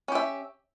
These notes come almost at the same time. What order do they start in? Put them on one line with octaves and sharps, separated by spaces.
C#4 G4 E5